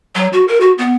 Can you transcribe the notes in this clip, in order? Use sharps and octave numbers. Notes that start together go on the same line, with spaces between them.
F#3
F#4
A#4
F#4
B3